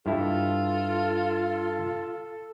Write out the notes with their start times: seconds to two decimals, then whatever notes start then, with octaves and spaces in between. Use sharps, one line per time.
0.06 G2 E4 F4 A4